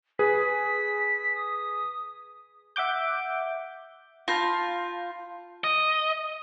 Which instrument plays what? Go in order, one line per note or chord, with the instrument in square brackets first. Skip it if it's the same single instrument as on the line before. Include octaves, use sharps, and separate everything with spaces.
[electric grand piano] G#4 B4 [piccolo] B6
[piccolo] D#6
[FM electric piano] E5 F#5 D6 G6
[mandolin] F4 [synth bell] F5 G6 [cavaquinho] A5 B5
[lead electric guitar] D#5